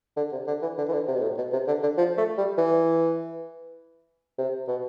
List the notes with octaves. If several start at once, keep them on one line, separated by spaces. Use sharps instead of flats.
D3
C3
D3
E3
D3
E3
D3
C3
B2
A2
B2
C3
D3
D3
F3
A3
G3
E3
C3
B2